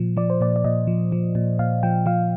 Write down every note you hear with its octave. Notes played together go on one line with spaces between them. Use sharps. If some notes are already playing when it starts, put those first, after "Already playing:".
Already playing: A#2 F3
F3 D5
C5
A#2 D5
D5
A#2 D#5
F3
F3
A#2
A#2 F5
F3 G5
F3 F5